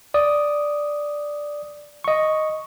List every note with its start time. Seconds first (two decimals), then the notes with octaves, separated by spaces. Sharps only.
0.14 D5 D#6
2.04 D#5 C#6